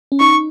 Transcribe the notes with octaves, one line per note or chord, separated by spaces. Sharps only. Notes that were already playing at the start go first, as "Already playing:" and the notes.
C#4
D#4 C#6